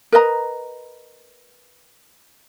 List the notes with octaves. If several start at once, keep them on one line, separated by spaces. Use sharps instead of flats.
A#4 B4 D#5 A#5